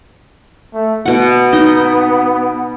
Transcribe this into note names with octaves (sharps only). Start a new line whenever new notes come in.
A3
B2 B3 F#5
D#4